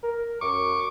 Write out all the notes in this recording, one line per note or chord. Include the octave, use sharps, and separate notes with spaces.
A#4
F#2 C#6 D6